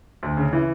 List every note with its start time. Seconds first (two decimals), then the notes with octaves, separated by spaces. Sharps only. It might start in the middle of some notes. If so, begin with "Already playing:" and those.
0.23 D2
0.37 C#3
0.53 E3